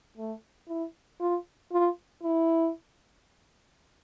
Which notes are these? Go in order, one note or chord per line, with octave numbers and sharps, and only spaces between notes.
A3
E4
F4
F4
E4